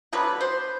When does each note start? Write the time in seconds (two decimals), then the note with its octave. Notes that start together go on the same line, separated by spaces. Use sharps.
0.13 D3 F#3 B3 B4
0.41 C5